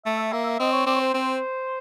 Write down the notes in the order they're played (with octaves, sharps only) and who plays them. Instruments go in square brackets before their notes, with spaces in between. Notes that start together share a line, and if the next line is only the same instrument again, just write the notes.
[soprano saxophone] A3 [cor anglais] E5
[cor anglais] E5
[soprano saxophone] A#3 [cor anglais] E5
[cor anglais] E5
[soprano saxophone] C4 [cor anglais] D#5
[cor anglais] C#5
[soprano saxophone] C4 [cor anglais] D5
[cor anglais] C#5
C5
[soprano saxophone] C4